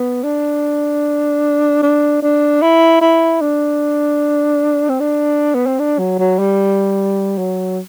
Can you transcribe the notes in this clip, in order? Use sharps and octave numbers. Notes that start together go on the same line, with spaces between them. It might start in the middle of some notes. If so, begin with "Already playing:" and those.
Already playing: B3
D4
D4
D4
E4
E4
D4
C4
D4
B3
C4
D4
F#3
F#3
G3
F#3